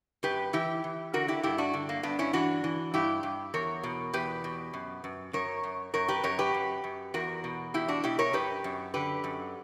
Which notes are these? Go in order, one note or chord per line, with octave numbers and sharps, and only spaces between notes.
F#2 G4 B4
E3 E4 G4
E3
D3 F#4 A#4
E4 G4
G2 E4 G4
D4 F#4
D3
A#3
G2 B3 D4
C#4 E4
E3 D4 F#4
E3
G2 E4 G4
G2
E2 A#4 C#5
B2
E2 G4 B4
B2
F#2
F#2
F#2 A#4 C#5
F#2
F#2 A#4 C#5
G4 B4
F#2 A#4 C#5
G4 B4
F#2
F#2
E2 F#4 A#4
B2
E2 E4 G4
D4 F#4
B2 E4 G4
A#4 C#5
F#2 G4 B4
F#2
D3 G4 B4
F#2